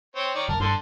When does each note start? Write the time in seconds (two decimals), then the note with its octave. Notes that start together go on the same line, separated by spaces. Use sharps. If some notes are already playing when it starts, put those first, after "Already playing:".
0.16 C4 C#5
0.35 D#3 C#5 D5
0.48 F1 A#4 A5
0.60 G2 D3 A4 C6